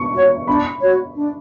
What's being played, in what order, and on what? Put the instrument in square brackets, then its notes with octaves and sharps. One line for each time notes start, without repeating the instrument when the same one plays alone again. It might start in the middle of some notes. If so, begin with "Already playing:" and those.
Already playing: [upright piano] C#6
[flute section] F#4 C#5
[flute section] D4 [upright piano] B5
[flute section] F#4 C#5
D4